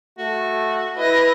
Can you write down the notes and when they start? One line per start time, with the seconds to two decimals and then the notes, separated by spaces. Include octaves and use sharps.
0.19 A3 F#4
0.98 E4 B4 D#5 A#6